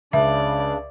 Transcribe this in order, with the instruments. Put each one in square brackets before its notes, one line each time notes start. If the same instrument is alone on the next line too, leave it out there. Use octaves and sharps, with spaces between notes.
[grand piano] C#2 [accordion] C#3 D4 [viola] D5 [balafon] E5